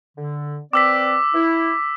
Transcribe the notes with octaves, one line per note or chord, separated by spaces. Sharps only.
D3
C4 B4 D5 D6 E6 B6
E4